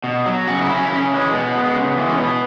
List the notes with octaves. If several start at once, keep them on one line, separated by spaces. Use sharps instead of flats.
B2
F#3
C#3 F#4
E4
F#3
C#4
E4
C#3 C#4
E3 G#3
B2 B3
G#3
C#3
E3 G#3
C#4
B2 B3